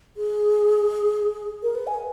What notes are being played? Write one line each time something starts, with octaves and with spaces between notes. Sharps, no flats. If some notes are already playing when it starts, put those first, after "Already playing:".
G#4
A#4
B4
G#5